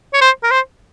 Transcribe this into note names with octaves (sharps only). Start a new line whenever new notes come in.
C#5
C5
A#4
C5